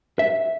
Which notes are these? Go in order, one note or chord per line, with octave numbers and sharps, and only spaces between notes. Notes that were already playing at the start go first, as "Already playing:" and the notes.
E5